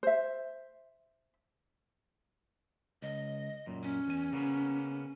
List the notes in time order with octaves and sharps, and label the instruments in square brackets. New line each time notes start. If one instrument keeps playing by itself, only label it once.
[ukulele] C5 E5
[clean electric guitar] C#2 [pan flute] D#5
[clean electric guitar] F#2 A#2
[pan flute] C#4
[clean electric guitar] E2 G#5
C#3 A#3 B3